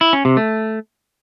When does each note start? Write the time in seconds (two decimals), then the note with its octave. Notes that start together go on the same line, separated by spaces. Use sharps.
0.01 E4
0.13 C#4
0.25 C3
0.37 A3